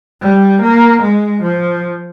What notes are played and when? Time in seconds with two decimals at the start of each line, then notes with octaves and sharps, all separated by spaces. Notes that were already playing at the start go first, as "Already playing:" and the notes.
0.21 G3
0.62 A#3
1.02 G#3
1.42 F3